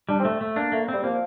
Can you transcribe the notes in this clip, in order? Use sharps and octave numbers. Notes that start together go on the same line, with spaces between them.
G3 D4
C4
A3
A3
A#3 D4
A3 A#3
G3 C4
F3 A#3